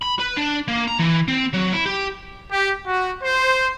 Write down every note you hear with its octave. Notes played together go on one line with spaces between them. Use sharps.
B5
B4
D4
A#3
A#5
E3
C4
F#3
E4
G4
G4
F#4
C5